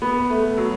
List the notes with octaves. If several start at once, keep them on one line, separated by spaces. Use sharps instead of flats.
B3
A3
F#3